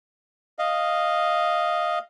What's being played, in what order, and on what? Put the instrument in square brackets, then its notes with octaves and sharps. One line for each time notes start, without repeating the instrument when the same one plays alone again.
[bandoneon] D#5 F5